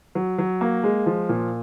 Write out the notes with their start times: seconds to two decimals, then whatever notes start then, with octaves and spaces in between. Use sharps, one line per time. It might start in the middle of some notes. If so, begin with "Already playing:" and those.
0.15 F#3
0.38 F#3
0.61 A#3
0.83 G#3
1.06 F3
1.29 A#2